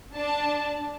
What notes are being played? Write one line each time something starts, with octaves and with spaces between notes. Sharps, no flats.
D4 A5